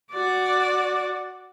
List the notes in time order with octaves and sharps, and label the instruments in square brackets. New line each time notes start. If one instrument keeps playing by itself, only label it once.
[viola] F#4 D5